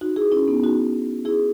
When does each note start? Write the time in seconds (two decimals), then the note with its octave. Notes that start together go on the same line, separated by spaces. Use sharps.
0.01 D#4 F#4
0.16 E4 G#4
0.32 C#4 E4
0.48 B3 D#4
0.63 D#4 F#4
1.25 E4 G#4